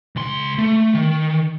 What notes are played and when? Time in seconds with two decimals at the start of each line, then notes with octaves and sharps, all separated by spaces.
0.16 C#2 C6
0.58 A3
0.95 D#3